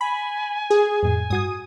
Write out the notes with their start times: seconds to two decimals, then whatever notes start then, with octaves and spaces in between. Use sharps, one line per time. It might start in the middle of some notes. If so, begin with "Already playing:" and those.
0.01 G#5 B5
0.70 G#4
1.03 F2 A2 G#5
1.30 G2 F#4 D#6 G#6